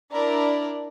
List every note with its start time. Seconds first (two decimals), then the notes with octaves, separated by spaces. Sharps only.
0.11 D4 E4 A#4 D5